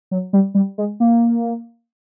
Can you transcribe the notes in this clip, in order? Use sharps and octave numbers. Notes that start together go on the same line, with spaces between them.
F#3
G3
G3
G#3
A#3